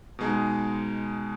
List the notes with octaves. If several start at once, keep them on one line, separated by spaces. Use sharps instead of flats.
B2 G#3 D#4 G#4